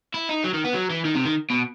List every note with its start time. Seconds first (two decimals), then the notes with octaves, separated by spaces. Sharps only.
0.14 E4
0.29 D#4
0.44 F#3
0.54 D#3
0.65 B3
0.74 F#3
0.90 E3
1.05 D#3
1.15 C3
1.25 D#3
1.50 B2